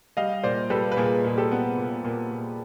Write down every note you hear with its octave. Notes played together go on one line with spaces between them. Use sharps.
G3 D#5 F5
A#2 C5 D5
G3 A4 B4
B4
A#2 G#4 A#4
A#2 G#4
G4 A4
B3
A#2
A#2
A#2